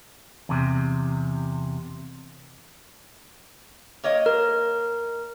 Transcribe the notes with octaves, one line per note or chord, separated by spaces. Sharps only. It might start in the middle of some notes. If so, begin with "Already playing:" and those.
E2 C3
A#3 C#5 D#5
A#4